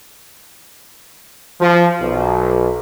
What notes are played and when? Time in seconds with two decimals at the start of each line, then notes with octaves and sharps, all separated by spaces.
1.61 F3
2.00 B1